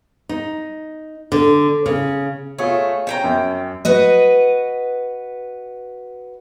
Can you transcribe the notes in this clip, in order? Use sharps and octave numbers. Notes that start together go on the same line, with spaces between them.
D#4
D3
C#3
A3 F4 G#4 C#5
C#4 G5 A#5
F#2
F#4 B4 D#5